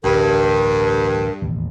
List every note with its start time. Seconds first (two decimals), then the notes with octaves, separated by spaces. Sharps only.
0.04 A1 D2 G2 A#4
1.42 E1 A1 D#2